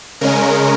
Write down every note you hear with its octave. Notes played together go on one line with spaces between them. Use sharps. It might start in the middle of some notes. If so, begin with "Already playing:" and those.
C#3 G#3 C#4 A#4